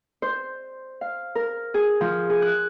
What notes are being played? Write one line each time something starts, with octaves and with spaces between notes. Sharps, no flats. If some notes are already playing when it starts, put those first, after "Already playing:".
C5
F5
A#4
G#4
F3
G#4
F#6